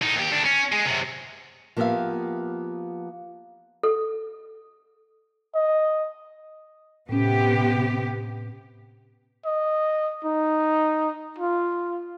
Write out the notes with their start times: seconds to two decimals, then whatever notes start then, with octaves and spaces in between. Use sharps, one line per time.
0.02 A2 D#4
0.16 D#2 G4
0.32 D2 D4
0.45 C#4
0.73 G#3 G#4
0.86 F#2 C3
1.77 F3 A#3 B3 G4 E5 F5
3.83 A4
5.55 D#5
7.09 A2 C3 B3 C#4 G4
9.45 D#5
10.24 D#4
11.39 F4